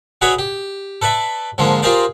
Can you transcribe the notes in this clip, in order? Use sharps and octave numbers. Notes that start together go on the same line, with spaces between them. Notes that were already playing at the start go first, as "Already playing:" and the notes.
F#4 G#4 B4 C#5 D5 E5
G4
A4 B4 D5 E5
G#2 D3 F3 G#3 A#3
F4 G4 G#4 A#4 C5 D5